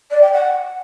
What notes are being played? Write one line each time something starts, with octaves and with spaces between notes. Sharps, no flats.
D5
G5
F#5